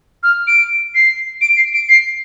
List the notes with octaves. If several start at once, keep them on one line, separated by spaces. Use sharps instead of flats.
F6
D7
C7
D7
C7
D7
C7